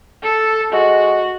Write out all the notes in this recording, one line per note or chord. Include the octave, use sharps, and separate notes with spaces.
A4
G#3 F#4